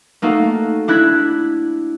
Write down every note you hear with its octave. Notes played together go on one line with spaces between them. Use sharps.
A3 A#3 D#4 F#4 A4
D4 E4 F#6 G#6 B6